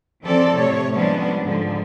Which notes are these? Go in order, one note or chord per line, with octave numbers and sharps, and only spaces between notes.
E3 F3 C4 A4 D5
A2 C3 C#5
F3 G3 G#3 B3 C#4 D4
G#2 D3 F3